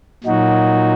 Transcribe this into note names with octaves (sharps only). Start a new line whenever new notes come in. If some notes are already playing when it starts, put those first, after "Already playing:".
A#2 F#3 D#4 F#4